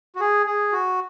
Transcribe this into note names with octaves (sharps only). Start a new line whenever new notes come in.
F#4
G#4
G#4
F#4